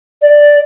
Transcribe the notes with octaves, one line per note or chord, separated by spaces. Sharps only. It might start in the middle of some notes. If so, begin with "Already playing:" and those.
D5